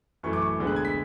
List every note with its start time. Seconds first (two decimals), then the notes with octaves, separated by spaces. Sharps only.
0.23 F#2 E3 A3 C#6
0.33 D6
0.42 C#6
0.58 D2 D3 G#3 B3
0.67 F#6
0.76 G#6
0.85 B6